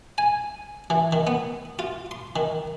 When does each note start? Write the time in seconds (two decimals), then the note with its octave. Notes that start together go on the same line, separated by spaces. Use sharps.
0.18 G#5
0.90 E3
1.13 D#3
1.27 B3
1.79 F4
2.11 C6
2.36 D#3